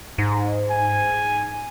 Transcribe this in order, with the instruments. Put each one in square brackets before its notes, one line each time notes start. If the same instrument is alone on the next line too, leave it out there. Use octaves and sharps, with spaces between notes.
[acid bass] G#2
[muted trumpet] G#5